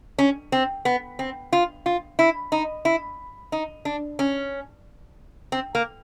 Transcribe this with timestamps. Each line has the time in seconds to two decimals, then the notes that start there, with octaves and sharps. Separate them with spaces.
0.18 C#4
0.52 C4
0.85 B3
1.19 C4
1.53 F4
1.86 F4
2.19 E4
2.52 D#4
2.85 E4
3.52 D#4
3.85 D4
4.19 C#4
5.52 C4
5.75 A#3